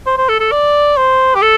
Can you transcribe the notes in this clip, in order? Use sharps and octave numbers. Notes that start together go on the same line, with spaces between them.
C5
C5
A4
A4
D5
C5
G4
A4